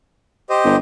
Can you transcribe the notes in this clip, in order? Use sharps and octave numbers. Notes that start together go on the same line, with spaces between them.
G4 C5 D#5
G1